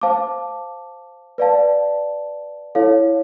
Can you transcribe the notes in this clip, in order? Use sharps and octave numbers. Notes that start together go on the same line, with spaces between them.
C5 F5 A5 D6
B4 D5 F5 A5
E4 A4 C#5 F5